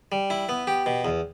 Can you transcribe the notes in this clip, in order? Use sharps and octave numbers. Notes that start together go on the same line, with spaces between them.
G3
E4
B3
G4
B2
E2